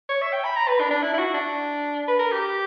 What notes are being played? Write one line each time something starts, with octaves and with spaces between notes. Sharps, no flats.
C#5
E5
G5
B5
A#5
B4
D4
D4
E4
E4
F#4
D4
B4
A#4
G4